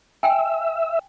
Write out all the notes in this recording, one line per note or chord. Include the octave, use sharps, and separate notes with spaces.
E5 G5 G#5